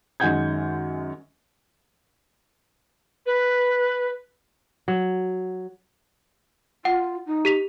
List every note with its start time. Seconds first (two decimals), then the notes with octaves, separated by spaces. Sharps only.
0.20 F#2 D#3 G#3 F#5 G6 G#6
3.26 B4
4.88 F#3
6.85 F4 F#5
7.27 D#4
7.45 G4 B6 F7